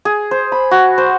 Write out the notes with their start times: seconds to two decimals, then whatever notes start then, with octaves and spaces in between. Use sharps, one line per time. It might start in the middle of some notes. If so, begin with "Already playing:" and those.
0.05 G#4
0.31 C5
0.52 B5
0.71 F#4
0.98 C5